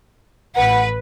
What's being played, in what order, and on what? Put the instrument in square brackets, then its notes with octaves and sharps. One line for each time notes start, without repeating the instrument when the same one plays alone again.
[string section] A1 B4 [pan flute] F#5